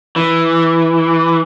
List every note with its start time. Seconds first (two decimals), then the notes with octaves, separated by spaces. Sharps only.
0.16 E3